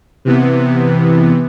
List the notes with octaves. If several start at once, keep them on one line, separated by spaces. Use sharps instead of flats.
C3 E3 B3